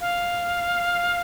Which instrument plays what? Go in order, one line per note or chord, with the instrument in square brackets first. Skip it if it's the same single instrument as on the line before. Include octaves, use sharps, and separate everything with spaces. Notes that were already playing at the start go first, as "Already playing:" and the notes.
[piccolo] F5